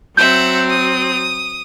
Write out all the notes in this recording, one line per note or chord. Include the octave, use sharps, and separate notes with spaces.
F#3 C4 E5 F#5 G6
D#6